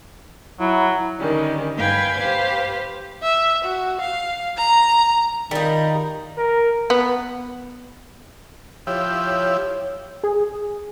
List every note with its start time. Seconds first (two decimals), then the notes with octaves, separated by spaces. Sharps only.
0.60 F#3 E4
1.19 D3 D#3 G3 C#4
1.77 G2 B4 F5 G5 G#5 G#6
2.17 G4 B4 C5 F5
3.23 E5
3.64 F#4
4.01 F5
4.57 A#5
5.51 D#3 G3 D#4 F4 A#4
6.38 A#4
6.90 B3
8.87 F3 E4 G4 C#5
10.24 G#4